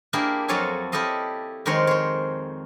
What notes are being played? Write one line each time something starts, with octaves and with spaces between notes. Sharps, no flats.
A#3 D4 E4 G4 G#4 A#4
F2 F#3 A4 C#5 F5 G#5
E4 G4 A4 D#5 F5
F2 D#3 G#3 A#4 C5 C#5
C5 C#5